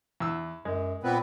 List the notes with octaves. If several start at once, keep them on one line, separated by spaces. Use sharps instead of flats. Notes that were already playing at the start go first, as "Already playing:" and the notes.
E2 E6
F#2 G#3
A#2 B3 C4 B4